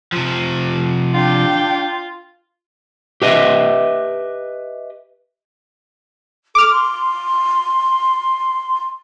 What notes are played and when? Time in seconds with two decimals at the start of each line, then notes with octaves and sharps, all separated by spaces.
0.12 C3 F3
1.14 D4 F4 G5
3.22 G4 B4 D#5 E5
6.55 A4 D6 F6
6.70 C6